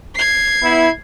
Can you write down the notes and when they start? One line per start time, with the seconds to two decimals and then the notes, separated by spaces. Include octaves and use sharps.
0.15 G#6 C7
0.62 B3 E4